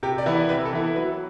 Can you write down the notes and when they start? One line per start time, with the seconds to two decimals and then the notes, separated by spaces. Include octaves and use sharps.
0.03 C3 G4
0.18 D5
0.26 E3 B3 E4
0.34 D5
0.49 C3 B4
0.65 A4
0.73 E3 B3 E4
0.95 F#3 B4